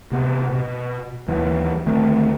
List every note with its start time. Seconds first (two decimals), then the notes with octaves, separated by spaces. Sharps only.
0.12 C3 B3
0.50 B2
1.28 D#2 E3 F#3
1.86 D2 D#3 A3 C4